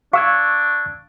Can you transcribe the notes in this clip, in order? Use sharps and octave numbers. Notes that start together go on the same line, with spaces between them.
D4 F5 C#6 E6 G#6